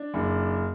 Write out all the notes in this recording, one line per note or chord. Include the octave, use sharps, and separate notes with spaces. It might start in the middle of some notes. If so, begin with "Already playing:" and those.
Already playing: D4
F#1